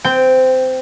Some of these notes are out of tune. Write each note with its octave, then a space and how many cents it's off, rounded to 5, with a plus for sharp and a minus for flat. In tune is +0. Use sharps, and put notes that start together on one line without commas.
C4 -20 G5 +0